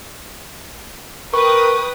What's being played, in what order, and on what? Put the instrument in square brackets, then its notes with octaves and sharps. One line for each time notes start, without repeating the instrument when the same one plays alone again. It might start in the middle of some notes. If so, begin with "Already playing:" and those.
[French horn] A#4 [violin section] B4 G5 D#6 [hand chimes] C#6